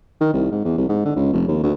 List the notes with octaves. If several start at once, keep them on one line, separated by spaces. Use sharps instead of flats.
D#3
C2
G#2
E2
C2
G#2
D3
C#2
F1
D#2
D2